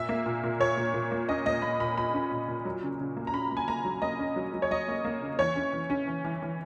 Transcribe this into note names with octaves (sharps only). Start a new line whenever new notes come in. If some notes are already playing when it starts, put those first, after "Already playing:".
Already playing: A#2 E5
A#3
A#2
A#2
A#2 C#5
A#2
A#2
A#3
C#4 D#5
A#3 D#5
A#3 B5
A#2 B5
A#2 B5
C#4
A#2
A#2
F#3
C#3
C#3
A#3
A#5
C#4 B5
A#3
G#5
A#3 A#5
F#3
A#3 D#5
C#4
F#3
F#3
C#5
F#3 D#5
A#3
A#3
C#3
E3 C#5
C#4
E3
C#4
E3
E3
E3